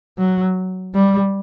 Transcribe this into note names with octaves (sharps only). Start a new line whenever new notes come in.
F#3
G3